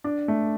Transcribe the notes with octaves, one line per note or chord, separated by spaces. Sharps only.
D4
A3